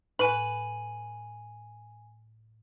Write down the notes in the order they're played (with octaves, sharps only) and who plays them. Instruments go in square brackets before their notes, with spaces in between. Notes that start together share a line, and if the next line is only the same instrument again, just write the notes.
[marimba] A2 [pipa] B4 [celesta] G#5 D#7 F#7